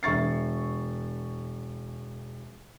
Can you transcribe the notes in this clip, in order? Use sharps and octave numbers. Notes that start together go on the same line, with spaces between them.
E1 E5 C#6 A6 C7